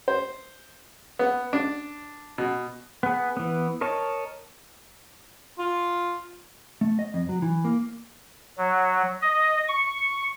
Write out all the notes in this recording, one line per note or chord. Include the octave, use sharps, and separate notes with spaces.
C5
B3
D4
B2
B3 G#4
E3 B3
A#4 C#5 D#5 A5
F4
A3
D#5
F2
F#3
E3
A#3
F#3
D#5
C#6